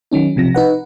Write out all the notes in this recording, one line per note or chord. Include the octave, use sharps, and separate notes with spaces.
D#3 F#3 C#4 D#4
B1 C3 F3 A#6
D#4 B4 F#5